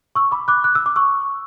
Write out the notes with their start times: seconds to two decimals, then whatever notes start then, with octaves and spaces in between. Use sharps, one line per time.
0.15 C#6 E6
0.31 B5 D6
0.48 D6 F#6
0.64 F#6
0.75 E6
0.86 D6
0.96 C#6 E6